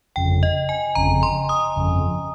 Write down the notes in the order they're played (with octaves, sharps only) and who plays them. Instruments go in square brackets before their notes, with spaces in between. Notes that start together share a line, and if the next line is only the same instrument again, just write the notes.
[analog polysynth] G1 F2 C#3 [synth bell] G5
[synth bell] D#5
G#5
[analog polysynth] G1 F2 C#3 [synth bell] A#5
[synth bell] C6
D#6
[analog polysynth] G1 F2 C#3